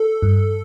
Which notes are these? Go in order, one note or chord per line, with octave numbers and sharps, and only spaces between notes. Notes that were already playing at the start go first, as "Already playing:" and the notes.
Already playing: A4
G2